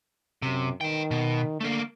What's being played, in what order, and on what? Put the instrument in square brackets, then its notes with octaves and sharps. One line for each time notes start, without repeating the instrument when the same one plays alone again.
[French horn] F#2 [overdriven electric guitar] C3
[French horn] D#3 [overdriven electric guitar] B4 G5
[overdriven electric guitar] B2
[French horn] D3 [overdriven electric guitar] A3 A#3